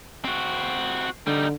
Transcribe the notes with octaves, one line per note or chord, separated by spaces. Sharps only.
C4 F#4
D3 G3 D#4